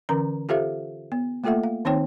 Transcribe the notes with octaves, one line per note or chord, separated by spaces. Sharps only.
D3 E3 C#4 A#4 A#5
F4 G4 A4 C5 E5 F5
B3
A3 A#3 F4 A4 E5 F#5
F5
D#3 C4 D#4 C5 C#5 G5